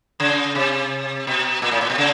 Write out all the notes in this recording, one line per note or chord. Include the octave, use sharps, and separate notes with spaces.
C#3
C3
B2
A#2
A2
A#2
B2
C#3